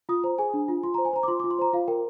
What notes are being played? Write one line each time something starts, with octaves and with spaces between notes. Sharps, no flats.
F4 D#6
C5 A#5
G#4 G#5
D4
F4
F4 C6
C5 A#5
G#5
C5 A#5
D6
F4 C6
D6
F4
C6
C5 A#5
F4 F5
A#4 G5